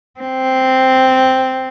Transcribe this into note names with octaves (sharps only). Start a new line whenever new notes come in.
C4